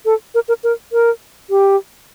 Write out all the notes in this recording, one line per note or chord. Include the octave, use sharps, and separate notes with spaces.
A4
A#4
A#4
A#4
A#4
G4